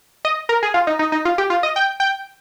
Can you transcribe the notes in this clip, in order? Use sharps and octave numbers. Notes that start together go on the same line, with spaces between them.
D#5
A#4
G#4
F4
D#4
D#4
D#4
F4
G4
F4
D#5
G5
G5